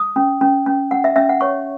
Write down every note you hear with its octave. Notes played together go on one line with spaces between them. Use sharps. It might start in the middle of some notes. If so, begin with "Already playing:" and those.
Already playing: D#6
C#4
C#4
C#4
C#4 F#5
E5
C#4 E5
F#5
C#5 C#6